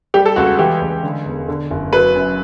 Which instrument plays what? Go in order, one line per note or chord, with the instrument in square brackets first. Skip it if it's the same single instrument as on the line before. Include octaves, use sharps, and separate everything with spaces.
[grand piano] G3 G4
A4
C#2 F#4
E3 G4
C#2
D3
E1
D3
F#1
F#3 B4
F#2